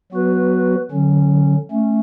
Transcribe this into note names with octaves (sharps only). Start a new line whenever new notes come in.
F#3 B3 F#4 B4
D3 F#3 C#4
A3 C#4